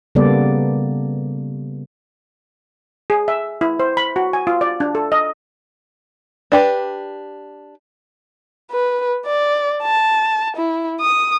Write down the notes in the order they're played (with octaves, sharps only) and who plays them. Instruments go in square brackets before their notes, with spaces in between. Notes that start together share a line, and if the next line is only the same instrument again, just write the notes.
[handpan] C#3 G3 A#3 B3 A4 D5
[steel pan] G#4
E5
E4
C5
B5
F#4
G#5
F4
D5
D4
A4
D#5
[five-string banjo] D4 G4 B4
[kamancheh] B4
D5
A5
E4
D#6